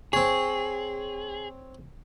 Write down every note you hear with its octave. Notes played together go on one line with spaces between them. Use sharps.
C4 G#4 C#5